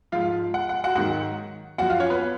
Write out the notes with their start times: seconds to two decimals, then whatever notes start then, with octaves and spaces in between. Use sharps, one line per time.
0.12 G#2 F3 F4 F5
0.54 F#5
0.69 F#5
0.84 F#4 F#5
0.95 G#2 D#3 F#3 F#4 F#5
1.78 F#2 F3 F#4 F#5
1.90 F4 F5
2.00 C#4 C#5
2.10 B3 B4